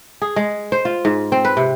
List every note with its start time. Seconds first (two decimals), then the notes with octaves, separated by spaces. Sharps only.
0.22 G#4
0.36 G#3
0.72 C5
0.85 F4
1.05 G#2
1.32 C4
1.45 B4
1.57 C3